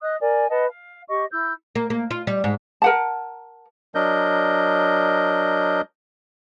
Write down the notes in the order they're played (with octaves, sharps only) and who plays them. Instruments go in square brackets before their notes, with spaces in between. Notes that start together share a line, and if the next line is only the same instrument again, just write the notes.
[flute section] D#5 D#6 F#6
A#4 D5 G#5
B4 D#5 F#5 A5
F5
G4 D#5 C#6
E4 E6 G6
[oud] A#3
A#3
F4
G3
G#2
[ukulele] A#4 F#5 A5
[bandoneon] F#3 D4 A#4 D#5 G6